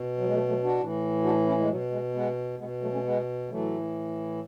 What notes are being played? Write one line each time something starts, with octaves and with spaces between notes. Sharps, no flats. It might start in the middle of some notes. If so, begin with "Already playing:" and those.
Already playing: B2
F#3
G#3
F#3 A3
F#3 A3
D4 F#4
A2 E3
D4 F#4
C#4 E4
G#3
B2 F#3
G#3
G#3 B3
B2 G#3 B3
F#3 A3
A3 C#4
G#3 B3
A2 E3 F#3 A3